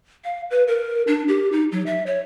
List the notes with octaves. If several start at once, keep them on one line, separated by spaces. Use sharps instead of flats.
F5
B4
A#4
D4
G4
D#4
F#3
E5
C#5